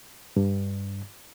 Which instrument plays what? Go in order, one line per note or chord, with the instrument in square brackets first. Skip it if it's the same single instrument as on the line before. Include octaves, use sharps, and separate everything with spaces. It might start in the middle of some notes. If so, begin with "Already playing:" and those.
[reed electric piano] G2